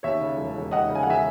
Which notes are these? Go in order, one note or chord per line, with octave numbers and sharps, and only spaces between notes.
D#2 C#5 E5
C#3
E1
E1
D#2 D#5 F#5
C#3
G#5
F#5
E1 E5 G#5